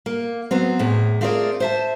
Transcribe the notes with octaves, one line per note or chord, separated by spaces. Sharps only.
A#3
F#3 B3 C4
E2 A2 G#4
A3 C4 F4 G#4 A#4 D5
C5 E5 A5